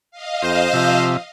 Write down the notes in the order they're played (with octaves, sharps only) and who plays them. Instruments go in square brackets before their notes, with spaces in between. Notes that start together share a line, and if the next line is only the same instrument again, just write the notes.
[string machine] D#5 F5
[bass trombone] F2 [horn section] C5
[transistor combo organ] C3 E5 [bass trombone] F3